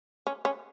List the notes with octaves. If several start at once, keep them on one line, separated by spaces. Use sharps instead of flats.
C#4
C#4